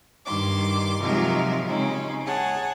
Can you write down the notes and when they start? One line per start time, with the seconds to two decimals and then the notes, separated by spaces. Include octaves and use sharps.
0.25 G2 D#3 C6 D6
1.01 C3 F3 F#3 G#3 D#4 A#4
1.66 C#3 G#3 C4 C#4 D#4
2.26 G#4 C#5 F#5 A5